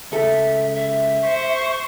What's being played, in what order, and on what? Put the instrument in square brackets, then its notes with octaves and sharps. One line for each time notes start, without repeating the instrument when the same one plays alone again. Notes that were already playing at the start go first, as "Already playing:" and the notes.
[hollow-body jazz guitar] C#2 A4 [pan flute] E5
[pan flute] E5
[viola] C5 C#6